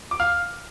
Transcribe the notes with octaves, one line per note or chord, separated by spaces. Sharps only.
D6
F5 F6